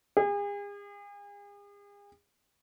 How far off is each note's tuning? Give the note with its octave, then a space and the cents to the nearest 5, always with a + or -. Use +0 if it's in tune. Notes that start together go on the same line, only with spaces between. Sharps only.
G#4 -40